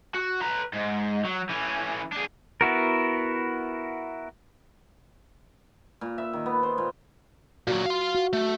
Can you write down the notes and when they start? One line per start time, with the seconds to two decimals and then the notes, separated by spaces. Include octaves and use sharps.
0.14 F#4
0.41 B4 A#5
0.73 G#2
1.25 F#3
1.50 E3 C#4
2.13 D4 G#4
2.61 B3 E4 F#4 A#4
6.01 A#2
6.18 E5
6.33 D#3
6.46 B3
6.63 C5
6.78 A#2
7.67 A#2 F#3 F#4
7.86 F5 C6
8.15 F#4
8.33 A3